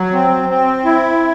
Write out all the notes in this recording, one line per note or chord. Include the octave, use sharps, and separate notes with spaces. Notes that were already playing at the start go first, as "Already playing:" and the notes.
Already playing: F#3
C4
C4
E4